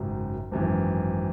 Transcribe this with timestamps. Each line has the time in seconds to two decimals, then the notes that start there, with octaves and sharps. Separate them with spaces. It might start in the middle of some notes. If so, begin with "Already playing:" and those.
Already playing: G#1 F#2 C#3 F#3
0.52 G#1 F#2 E3